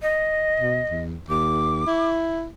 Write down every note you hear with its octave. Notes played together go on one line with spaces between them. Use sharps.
D#5
B2
E2
D#2 D6
E4